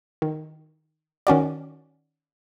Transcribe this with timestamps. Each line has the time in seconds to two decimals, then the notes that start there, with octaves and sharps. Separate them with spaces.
0.22 D#3
1.27 D#3 C#4 F#4 D5